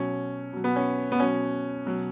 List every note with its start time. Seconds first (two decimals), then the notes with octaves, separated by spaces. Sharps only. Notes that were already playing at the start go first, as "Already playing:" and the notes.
Already playing: B2 F#3 C#4
0.53 B2 F#3
0.64 B3
0.76 C#4
1.12 B3
1.20 B2 F#3 C#4
1.86 B2 F#3